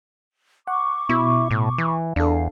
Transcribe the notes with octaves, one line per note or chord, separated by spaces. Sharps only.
F#5 C#6 D6
B2 E4
A2
E3
E2 D4 A4 F5